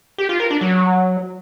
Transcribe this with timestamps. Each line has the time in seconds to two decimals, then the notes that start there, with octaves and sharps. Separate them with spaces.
0.18 G4
0.29 F4
0.40 A#4
0.51 D4
0.61 F#3